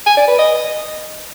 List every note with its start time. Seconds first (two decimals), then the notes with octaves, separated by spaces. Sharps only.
0.06 G#5
0.17 D5
0.28 B4
0.39 D#5